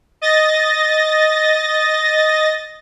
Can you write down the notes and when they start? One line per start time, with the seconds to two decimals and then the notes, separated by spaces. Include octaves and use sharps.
0.22 D#5 A6 A#6